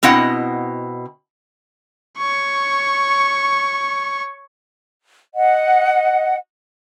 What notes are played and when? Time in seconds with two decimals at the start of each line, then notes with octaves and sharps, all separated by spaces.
0.03 B2 C4 E4 D#5 F#5
2.18 C#5 C#6
5.34 D#5 F#5